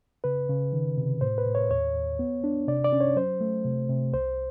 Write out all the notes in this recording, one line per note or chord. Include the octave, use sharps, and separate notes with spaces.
C#3 B4
C#3
D#3
C3
A2 C5
B4
A2
C#5
D#2 C#5
D#2
B3
D4
C3 D5
D5
C#4
C#5
F#3 C5
A3
C3
C3
C2 C5